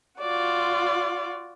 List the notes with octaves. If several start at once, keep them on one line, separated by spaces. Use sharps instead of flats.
F4 F#4 D5